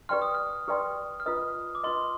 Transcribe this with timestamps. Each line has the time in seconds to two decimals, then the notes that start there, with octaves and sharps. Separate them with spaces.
0.09 G4 B4 D5 G5 C6 F6
0.22 D#6
0.35 F6
0.68 G4 B4 D5 G5 C6
1.20 F6
1.26 F4 B4 D#5 D#6
1.75 D6
1.83 F4 B4 D#5 C6